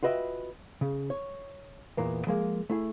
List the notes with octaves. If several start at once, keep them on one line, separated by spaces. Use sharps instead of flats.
F4 F#4 B4 D#5 E5 G5
C#3
C#5
E2 A#2 A#3 B3
F3 G#3 A#3
A3 E4 G#4